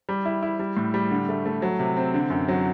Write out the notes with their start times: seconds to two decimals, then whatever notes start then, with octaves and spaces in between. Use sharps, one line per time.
0.09 G3
0.25 E4
0.43 E4
0.59 G3
0.77 A2
0.94 G3
1.11 D3
1.29 A3
1.46 A3
1.62 F#3
1.79 C3
1.96 C4
2.14 D3
2.30 F#2
2.48 F#3